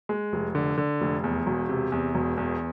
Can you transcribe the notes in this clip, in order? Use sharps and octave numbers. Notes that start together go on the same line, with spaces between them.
G#3
F1
D3
D3
F1
E2
E1
C3
E2
E1
E2